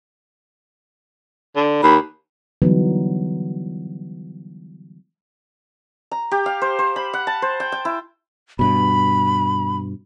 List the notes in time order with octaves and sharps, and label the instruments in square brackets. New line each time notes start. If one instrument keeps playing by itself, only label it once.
[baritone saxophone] D3
[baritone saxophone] D#2 [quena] B5
[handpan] D3 E3 F#3 G3 B3 D#4
[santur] A#5
G4
F5
C5
C5
B5
F#5
A5
C5
G5
G5
E4
[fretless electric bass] G2 B2 [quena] B5